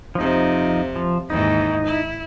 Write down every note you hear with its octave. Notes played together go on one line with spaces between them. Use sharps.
F2 C3 F3 D#4
F3
D#2 G#2 E3 D#4
E4